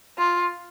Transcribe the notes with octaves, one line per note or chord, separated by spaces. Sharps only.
F4